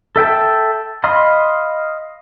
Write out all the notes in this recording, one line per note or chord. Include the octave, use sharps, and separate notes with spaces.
A4 E5 G5 A5
D#5 F5 B5 C6